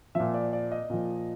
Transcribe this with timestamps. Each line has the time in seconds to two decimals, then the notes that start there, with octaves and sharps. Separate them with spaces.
0.15 A#2 F3 E5
0.34 D5
0.53 D5
0.71 D#5
0.90 A#2 F3